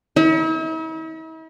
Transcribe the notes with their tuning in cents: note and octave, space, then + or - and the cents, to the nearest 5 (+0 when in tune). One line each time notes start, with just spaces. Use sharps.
E4 -45